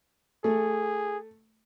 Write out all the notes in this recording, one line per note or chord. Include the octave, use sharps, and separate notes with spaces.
A3 G#4